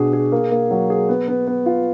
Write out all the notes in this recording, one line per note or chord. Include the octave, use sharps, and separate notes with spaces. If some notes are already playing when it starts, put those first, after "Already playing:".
Already playing: B2 D4 G#4
G#4
A#3
A#3
F#3
G#4
B3
B3
B3
F4